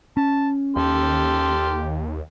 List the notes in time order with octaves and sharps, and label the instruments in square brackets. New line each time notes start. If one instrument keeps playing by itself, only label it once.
[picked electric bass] C#4 [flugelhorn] A5
[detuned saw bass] D#2 [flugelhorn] G4 [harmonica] A4 C6 F6